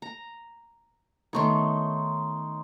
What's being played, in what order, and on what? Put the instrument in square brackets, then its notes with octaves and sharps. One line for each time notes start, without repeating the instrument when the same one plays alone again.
[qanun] A#5
[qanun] D#3 A3 B3 [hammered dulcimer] D#4 C#5 C6